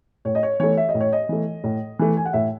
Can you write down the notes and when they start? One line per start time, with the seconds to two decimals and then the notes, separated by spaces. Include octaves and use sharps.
0.25 A2 C#5
0.35 D#5
0.43 C#5
0.60 E3 A3 C#5
0.77 E5
0.89 D#5
0.94 A2
1.01 C#5
1.13 D#5
1.29 E3 A3
1.64 A2
1.99 E3 A3
2.17 G#5
2.25 F#5
2.33 A2 E5